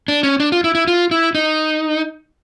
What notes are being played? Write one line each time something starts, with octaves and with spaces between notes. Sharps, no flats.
D4
C#4
D4
F4
E4
E4
F4
E4
D#4